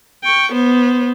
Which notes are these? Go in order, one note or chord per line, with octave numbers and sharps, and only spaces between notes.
G5 C#6
B3 C5